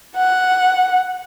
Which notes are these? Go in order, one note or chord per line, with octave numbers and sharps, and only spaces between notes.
F#5